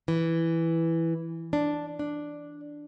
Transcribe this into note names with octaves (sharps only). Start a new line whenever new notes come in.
E3
D4
D4